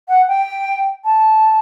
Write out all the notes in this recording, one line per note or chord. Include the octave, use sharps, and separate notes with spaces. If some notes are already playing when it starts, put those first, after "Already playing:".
F#5
G5
A5